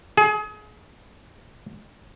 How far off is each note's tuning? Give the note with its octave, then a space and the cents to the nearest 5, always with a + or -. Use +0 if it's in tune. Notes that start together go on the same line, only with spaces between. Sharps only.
G#4 +30